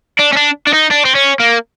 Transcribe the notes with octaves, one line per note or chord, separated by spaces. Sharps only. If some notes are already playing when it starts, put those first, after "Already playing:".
D4
C#4
D4
D4
D#4
D4
C4
C#4
A#3